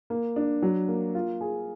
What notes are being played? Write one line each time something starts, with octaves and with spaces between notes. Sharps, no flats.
A#3
D4
F#3
A#3
F4
G#4